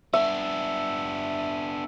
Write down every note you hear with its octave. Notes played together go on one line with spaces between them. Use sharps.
B3 D4 E5